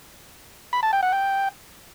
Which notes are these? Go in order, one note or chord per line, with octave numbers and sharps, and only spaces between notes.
B5
A5
G5
F#5
G5